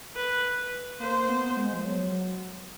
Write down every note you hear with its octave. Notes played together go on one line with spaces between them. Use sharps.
B4
A#3 C5
B3
G#3
F3
F#3